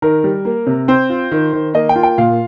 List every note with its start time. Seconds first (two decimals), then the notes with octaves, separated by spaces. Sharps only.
0.02 D#3 A#4
0.24 G3
0.45 A#3
0.67 C3
0.88 C4 C5
1.10 F4
1.31 D#3
1.53 D#3
1.74 A#3 D#5
1.89 G5
1.96 F4
2.03 G5
2.18 A#2 F5